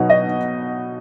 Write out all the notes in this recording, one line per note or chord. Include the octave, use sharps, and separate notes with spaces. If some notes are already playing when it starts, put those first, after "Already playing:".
Already playing: B2 F#3 B3 D#4
D#5